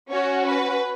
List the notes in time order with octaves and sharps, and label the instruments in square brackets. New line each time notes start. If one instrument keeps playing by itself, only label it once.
[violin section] C#4 F#4 C#5
B4